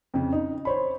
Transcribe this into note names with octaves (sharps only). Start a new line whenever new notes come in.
F2 C#3
D#4
C5 C#5 B5